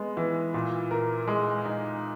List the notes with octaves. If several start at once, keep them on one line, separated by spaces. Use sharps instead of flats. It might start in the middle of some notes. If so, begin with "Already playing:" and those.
Already playing: G#3 B3
E3
A#2
A#4
G#3
D#4